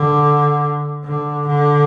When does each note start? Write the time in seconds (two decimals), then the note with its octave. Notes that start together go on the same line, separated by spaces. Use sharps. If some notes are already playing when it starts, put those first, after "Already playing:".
Already playing: D3
1.04 D3
1.47 D3